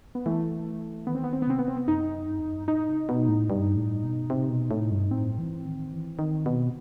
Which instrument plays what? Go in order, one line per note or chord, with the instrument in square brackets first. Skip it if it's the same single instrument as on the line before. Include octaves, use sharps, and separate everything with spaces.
[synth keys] B3
[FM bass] E3 [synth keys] A3
[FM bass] D#3 [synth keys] B3
[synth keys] C4
B3
C4
B3
[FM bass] C3 [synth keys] C4
[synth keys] B3
C4
B3
[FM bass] F#2 [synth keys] D#4
[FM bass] G2
E2
F#2
G2
[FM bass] A2 [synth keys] D#4
[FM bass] C3
B2
A2
G2
A2
B2
C3
B2
A2
G2
[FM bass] A2 [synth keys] C4
[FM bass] E3
D#3
E3
D#3
B2